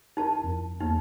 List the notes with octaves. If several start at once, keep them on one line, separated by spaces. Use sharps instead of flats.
D#4 E4 A#4 A5
F2
E2 A#3 D#4